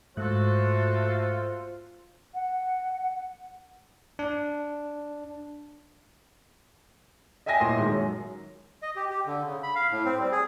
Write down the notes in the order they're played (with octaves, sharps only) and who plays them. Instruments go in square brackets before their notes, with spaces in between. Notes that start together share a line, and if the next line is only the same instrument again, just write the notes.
[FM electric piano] G#2 F#6 [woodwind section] A3 F#4 A4 [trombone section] F4 [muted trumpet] C5
[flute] F#5
[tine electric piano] D4
[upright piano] D#5 E5 G5 G#5 A#6
D#1 A2 C6
D#3 G#3
F#2
[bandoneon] D#5
G4
G4
D3
C#3
B5
F5
A2
C4
G3
G#4